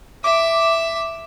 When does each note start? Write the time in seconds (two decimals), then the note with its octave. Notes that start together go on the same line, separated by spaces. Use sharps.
0.24 E5 D6